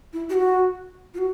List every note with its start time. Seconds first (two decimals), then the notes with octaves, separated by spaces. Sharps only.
0.13 E4
0.30 G4
0.34 F#4
1.14 F4
1.18 F#4